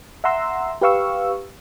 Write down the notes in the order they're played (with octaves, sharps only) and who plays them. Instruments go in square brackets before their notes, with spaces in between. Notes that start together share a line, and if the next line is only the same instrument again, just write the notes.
[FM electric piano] E5 F#5 A#5 C6 E6
G4 B4 F5 C#6 E6